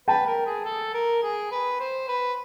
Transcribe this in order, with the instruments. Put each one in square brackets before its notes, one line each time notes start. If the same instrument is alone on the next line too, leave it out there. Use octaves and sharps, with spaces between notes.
[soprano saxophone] B4 [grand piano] G5 A5
[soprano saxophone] A#4
G#4
A4
A#4
G#4
B4
C5
B4